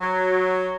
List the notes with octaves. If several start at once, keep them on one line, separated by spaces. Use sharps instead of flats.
F#3